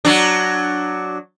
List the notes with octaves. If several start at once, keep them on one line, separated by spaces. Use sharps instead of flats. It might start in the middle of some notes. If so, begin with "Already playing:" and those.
F#3 D4